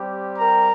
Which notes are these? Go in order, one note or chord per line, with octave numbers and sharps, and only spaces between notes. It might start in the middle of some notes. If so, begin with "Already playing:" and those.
Already playing: G3 C4 G4
A#4 A#5